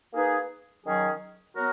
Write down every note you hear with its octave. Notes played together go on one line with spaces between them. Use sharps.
A#3 D#4 G#4 B4
D#3 F#3 C#4 G#4
F#3 B3 F#4 A#4